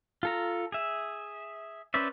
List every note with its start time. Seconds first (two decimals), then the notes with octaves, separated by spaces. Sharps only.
0.23 F4 A4 A#5
0.72 G#4 E5
1.94 C#4 B4 C5 D5 E5